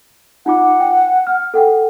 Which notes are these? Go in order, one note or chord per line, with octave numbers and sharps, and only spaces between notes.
D#4 F4 F#5 D6
G5
F6
A4 F#5 G5